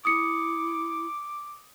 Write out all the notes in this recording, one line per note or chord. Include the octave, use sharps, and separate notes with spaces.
E4 D6 D#6 C#7